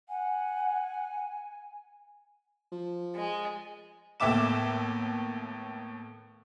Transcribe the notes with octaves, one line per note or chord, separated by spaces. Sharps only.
F#5 G#5
F3
G#3
D#2 A2 B3 E5 D6 E7